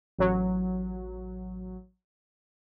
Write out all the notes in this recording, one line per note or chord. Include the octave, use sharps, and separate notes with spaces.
A1 F#3